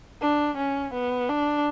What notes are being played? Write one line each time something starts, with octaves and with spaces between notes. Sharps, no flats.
D4
C#4
B3
D4